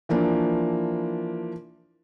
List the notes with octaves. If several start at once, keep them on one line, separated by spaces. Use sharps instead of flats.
E3 F3 A#3 D4